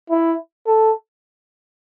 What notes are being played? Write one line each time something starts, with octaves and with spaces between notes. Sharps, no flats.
E4
A4